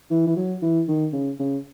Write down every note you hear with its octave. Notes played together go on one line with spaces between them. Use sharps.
E3
E3
F#3
E3
D#3
C#3
C#3